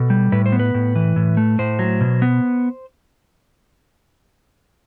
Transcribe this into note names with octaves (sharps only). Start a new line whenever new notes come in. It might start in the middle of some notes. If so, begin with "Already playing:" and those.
Already playing: B2 A4
G3
A2 B4
C5
B3
B4
A2
E3
A2
A3
A2 C5
F#3
B2
B3